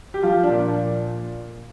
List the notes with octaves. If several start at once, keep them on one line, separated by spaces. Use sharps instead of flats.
G4
F3 F4
D4
A#2